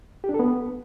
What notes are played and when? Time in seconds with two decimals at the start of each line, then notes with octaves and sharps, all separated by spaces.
0.24 G4
0.29 D4
0.34 A4
0.39 B3